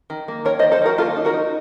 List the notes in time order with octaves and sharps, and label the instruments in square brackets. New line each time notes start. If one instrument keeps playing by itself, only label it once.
[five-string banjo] D#3
A#3
D#3 A#4 C#5
C5 D#5
D#3
A4 C5
D#3 F#4 A#4
A#3 F4 A4
D#4
F#4 A#4
D#4